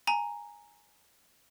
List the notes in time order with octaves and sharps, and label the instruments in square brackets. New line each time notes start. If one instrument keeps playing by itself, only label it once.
[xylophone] G#5 A#5